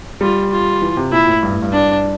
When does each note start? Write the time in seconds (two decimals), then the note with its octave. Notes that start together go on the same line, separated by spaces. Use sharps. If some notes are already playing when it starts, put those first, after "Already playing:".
0.21 G3 F4
0.51 F4
0.82 E3
0.97 C3
1.12 A#2 E4
1.27 A2
1.43 G2
1.52 A2
1.62 G2
1.72 D4